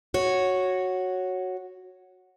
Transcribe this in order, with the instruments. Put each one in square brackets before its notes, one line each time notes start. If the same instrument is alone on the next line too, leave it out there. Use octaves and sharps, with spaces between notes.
[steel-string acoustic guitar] F#4 C#5